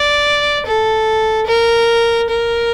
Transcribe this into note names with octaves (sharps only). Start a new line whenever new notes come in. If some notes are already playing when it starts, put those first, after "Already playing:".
Already playing: D5
A4
A#4
A#4